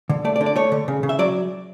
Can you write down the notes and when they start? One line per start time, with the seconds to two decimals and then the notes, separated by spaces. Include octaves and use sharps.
0.09 D3
0.25 A3 D5
0.36 D5
0.41 D3
0.46 D5
0.56 A3 C#5
0.72 D3
0.88 C#3
1.03 C#3
1.09 E5
1.19 F#3 D5